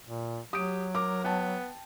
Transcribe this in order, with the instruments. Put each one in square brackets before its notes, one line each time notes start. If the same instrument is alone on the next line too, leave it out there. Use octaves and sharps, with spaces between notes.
[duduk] A#2
[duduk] F#3 [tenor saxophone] G4 [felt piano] D#6 D7
[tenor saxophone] A#4 [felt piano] D6
[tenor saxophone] B3 [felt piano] G5 A5